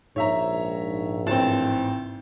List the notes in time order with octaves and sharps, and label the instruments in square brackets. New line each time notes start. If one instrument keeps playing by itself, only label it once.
[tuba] A#1 [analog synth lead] G#2 [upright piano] C#5 E5 A#5
[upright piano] A1 [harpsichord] C4 A5